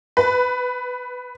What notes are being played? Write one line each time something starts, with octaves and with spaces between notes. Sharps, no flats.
B4